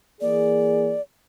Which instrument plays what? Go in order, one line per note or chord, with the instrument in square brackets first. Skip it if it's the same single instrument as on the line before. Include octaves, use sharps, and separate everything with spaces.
[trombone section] E3 A#3 G#4 [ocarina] D5